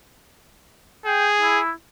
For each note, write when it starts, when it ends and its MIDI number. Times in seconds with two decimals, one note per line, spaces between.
1.06 1.60 68
1.06 1.27 79
1.42 1.71 64